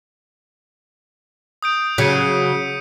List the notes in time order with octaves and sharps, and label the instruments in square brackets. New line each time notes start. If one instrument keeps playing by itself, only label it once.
[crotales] D#6 G6 D7
[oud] C#3 F#3 [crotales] B6 C#7 D#7